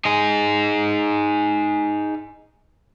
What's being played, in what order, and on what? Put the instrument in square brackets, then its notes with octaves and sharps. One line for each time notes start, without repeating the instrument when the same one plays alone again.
[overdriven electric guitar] D#4 G#4